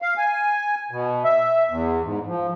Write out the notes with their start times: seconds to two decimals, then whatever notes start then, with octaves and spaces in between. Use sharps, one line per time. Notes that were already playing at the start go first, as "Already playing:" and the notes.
0.02 F5
0.17 G#5
0.91 B2
1.24 E5
1.69 E2
2.04 G#2
2.27 F3